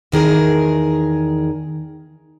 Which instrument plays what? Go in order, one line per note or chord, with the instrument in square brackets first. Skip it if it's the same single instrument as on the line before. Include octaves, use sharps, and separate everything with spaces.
[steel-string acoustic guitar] E2 D#3 G#4 A#4